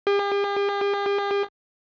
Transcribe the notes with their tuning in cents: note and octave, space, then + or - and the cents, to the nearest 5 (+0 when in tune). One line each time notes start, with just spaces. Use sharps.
G4 +45